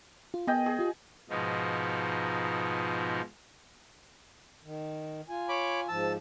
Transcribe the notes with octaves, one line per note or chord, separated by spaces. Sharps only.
F4
B3 G#4 D#5 G5
G#4
F4 G4
G#2 B2 F3 D#4
D#3
F4 G#5
C#5 B5 D6
G#2 F3 A5 E6